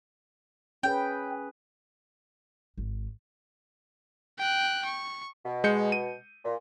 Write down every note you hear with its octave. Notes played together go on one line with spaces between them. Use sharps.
C#4 G#4 B4 G5
G#1
G5 F#6
C#6
B2
G#3 G6 C#7
D#7
A#2